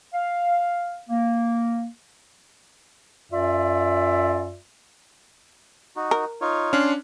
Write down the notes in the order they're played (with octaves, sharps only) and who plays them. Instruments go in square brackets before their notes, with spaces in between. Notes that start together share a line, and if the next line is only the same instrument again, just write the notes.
[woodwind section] F5
A#3
F#2 F4 D5 E5
[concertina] D#4 F#4
[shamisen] A#4
[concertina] D#4 F4 C#5
[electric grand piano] C#4 D4 [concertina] F5 C6